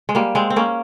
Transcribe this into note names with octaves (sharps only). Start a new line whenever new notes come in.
G#3
G3 A#3
G#3 C4
C4
A#3 C#4